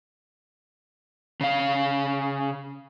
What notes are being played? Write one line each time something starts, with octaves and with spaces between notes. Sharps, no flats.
C#3 F5